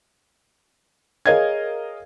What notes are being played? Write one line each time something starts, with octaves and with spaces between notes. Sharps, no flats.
G#4 A#4 C#5 D#5 F5 G#6